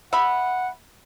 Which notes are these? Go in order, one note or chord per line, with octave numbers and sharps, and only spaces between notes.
E5 F#5 B5